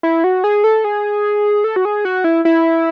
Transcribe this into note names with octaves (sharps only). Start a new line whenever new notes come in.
E4
F#4
G#4
A4
G#4
A4
F#4
G#4
F#4
E4
E4